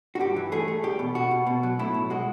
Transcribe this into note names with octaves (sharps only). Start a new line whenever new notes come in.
F#4
G2 G4
E3
A3 G#4
A3
E2 G4
B2
B2 F#4
B2
B2
F#3
A2 E4
B1
G#3 F#4